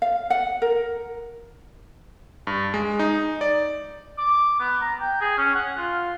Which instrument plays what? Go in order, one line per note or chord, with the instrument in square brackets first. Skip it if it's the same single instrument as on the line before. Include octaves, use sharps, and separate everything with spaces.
[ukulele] F5
F#5
A#4
[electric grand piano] G2
G#3
D#4
D5
[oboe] D6
B3
A#5
G5
G#4
C#4
F#5
F4